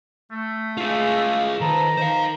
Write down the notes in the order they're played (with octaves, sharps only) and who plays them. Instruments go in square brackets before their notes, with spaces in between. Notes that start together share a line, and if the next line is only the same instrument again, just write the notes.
[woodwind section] A3
[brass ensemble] G#3 F5 [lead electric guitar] F4 G#4
[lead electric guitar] D#3 [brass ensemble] A4 B4 C5 [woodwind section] A#5
[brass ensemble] D#3 [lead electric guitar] C5 F5